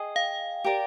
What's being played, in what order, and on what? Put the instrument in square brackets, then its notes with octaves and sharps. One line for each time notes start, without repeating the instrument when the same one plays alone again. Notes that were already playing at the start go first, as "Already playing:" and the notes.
Already playing: [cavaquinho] G#4 D#5 [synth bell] G5
[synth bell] F5
[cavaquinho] G4 A#4 D5